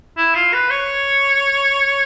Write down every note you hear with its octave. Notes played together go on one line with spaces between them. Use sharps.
E4
F4
B4
C#5